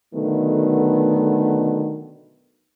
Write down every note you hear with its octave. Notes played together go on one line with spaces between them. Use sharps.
B2 D3 D#3 F#3 A3 B3